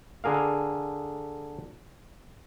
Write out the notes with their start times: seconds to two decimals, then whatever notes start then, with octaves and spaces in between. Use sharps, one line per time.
0.24 D3 G#4 A#4 F5